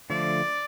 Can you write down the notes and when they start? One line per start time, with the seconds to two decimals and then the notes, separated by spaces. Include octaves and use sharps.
0.10 D3 F3 A3 D5